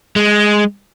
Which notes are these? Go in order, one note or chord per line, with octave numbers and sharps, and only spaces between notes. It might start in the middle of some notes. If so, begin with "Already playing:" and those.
G#3